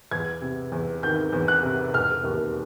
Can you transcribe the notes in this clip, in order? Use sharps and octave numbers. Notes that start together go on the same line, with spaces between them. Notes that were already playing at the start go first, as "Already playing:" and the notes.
E2 G#6
C3
E2
D#3 G6
E2
F#6
C3
E1 F6
D#2